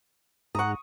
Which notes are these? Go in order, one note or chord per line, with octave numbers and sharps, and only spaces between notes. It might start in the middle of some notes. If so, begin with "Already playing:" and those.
G#2 F#5 A#5 C#6 D#6